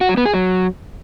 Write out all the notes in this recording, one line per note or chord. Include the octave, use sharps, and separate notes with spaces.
F#4
F#3
B3
G#4
F#3